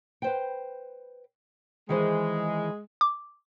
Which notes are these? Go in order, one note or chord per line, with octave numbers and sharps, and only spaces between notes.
B4 C5 G5
D#3 E3 G#3 C5
D6